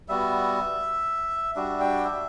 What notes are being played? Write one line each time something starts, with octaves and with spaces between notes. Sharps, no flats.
G3 B3 F#4 E5
G3 D4 F#4 E5
G5
E5